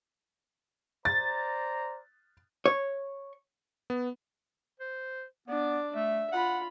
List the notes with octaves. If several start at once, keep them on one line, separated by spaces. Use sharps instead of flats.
C5 D5 A#5 A6
C#5
B3
C5
B3 D4 D5
A3 E5
F4 F#5 B5